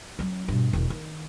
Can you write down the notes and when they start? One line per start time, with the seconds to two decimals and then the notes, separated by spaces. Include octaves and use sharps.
0.19 F#3 C#4
0.48 G2 B2
0.73 E1 D#3
0.90 D#3